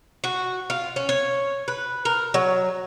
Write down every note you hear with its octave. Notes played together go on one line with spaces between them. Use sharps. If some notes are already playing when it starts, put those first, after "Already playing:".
F#4
F4
C#4
C#5
B4
A#4
F#3